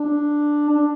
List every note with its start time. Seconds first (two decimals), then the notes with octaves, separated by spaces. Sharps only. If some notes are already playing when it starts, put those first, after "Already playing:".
Already playing: D4
0.69 D4